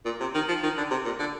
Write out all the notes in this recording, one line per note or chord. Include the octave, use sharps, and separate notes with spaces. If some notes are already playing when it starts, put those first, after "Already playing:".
A#2
C3
D#3
F3
D#3
D3
C3
A#2
D3